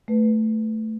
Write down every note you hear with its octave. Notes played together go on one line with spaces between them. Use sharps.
A3 B4